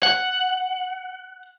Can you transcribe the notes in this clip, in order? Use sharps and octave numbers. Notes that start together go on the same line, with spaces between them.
F#5